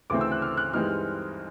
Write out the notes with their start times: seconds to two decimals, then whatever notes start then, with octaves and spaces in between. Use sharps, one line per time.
0.10 D2 C#3 E3 A3 C4 D6
0.21 E6
0.32 F#6
0.42 F6
0.57 F#6
0.73 G2 E3 G#3 C4 D#4 F6